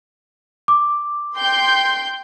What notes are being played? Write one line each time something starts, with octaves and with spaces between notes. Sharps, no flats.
D6
G5 C6 G6